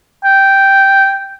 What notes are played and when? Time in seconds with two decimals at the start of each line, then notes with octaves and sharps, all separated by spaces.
0.24 G5